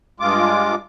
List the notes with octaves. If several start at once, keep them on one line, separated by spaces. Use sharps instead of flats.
G2 G#3 F4 D6